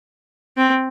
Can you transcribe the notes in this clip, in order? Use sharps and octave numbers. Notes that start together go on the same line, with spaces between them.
C4